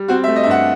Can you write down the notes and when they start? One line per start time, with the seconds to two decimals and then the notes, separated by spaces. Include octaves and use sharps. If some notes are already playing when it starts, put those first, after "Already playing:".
Already playing: G3
0.08 C4 F#4
0.24 E5
0.28 A3
0.36 D#5
0.43 E5
0.46 G2 F#5